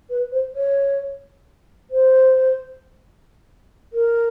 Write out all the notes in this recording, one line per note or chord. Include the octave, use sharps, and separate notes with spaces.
B4
C5
C#5
C5
A#4